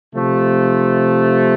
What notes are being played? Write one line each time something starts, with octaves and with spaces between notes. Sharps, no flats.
C3 F3 A3